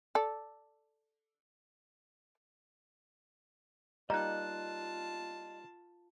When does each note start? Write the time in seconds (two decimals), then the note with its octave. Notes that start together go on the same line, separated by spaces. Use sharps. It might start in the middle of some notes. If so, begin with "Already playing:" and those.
0.15 A4 D5
4.10 G3 A#3 D#4 F4 D#5 A5 A#5 F#6